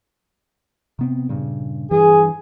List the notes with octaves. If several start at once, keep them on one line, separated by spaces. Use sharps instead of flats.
C3 B3 C4
G2 A#2 C#3
G2 E3 G#4